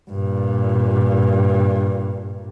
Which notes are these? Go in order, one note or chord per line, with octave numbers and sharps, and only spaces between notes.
G2 A#2